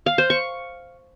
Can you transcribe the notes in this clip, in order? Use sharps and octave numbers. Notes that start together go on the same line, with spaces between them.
F5
C5
C#6